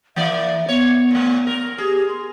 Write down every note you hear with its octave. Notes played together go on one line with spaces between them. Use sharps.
E3 A#3 D5 E5
B3 C#5
A#2 A3
A#4
G4 G#4
C6